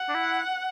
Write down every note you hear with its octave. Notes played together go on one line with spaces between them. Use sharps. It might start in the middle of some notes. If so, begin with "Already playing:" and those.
Already playing: F#5
D4
E4